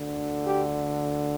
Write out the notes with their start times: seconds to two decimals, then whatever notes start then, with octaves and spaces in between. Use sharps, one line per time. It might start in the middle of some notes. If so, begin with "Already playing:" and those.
Already playing: D2 D3
0.47 G4